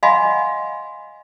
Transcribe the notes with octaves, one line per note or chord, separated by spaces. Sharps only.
D#5 F5 F#5 G#5 B5 C6